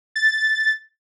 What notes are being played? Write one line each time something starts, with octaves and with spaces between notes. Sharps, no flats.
A6